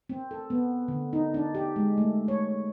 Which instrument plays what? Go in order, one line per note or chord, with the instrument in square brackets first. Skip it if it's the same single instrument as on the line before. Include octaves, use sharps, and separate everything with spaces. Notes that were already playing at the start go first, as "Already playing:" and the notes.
[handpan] C4
A4
B3
D3
D#4
D4
G4
G#3
A3
C#5